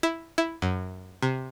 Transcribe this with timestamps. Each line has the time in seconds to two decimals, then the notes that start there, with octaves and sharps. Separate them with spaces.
0.03 E4
0.38 E4
0.62 F#2
1.22 C3